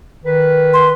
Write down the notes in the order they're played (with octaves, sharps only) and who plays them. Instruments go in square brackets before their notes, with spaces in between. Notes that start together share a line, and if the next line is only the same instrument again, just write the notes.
[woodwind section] D#3 B4
[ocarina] C6